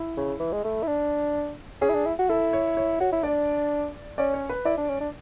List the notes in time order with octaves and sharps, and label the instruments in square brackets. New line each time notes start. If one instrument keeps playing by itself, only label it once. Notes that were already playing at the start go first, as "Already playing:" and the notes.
Already playing: [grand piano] E4
[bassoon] C#3
E3
G#3
A3
E4
D4
[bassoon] C#4 [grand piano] G#4
[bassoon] E4
D4
E4
F#4
[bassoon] E4 [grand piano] A4
[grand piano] C#5
C#5
[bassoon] F#4 [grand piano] C#5
[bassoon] E4
[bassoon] D4 [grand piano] D5
[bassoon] C#4 [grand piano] D5
[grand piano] C#5
B4
[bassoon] E4 [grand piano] D5
[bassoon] D4
C#4
D4